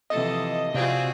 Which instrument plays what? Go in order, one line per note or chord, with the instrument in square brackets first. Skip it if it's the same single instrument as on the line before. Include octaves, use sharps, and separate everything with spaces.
[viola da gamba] C3 E3 F3 [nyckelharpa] A4 [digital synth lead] D#5
[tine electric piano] C3 D5 F5 [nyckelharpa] C4 [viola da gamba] F4 F#4 G#4